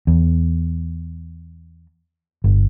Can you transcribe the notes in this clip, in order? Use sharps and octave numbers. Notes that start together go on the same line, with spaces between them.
E2
G1